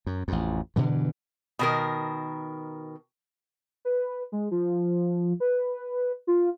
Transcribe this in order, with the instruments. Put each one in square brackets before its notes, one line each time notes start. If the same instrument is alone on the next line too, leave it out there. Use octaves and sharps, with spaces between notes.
[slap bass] F#2
A1 F2
G2 B2 D3 E3
[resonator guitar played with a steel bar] B2 D#3 A#4
[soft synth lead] B4
G#3
F3
B4
F4